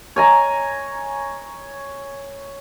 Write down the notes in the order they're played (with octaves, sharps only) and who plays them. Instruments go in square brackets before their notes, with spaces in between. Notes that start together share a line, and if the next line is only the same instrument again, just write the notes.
[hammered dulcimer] C#5 G#5 A#5